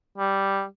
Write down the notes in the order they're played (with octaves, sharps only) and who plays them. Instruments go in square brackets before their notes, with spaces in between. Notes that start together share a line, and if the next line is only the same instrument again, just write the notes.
[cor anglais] G3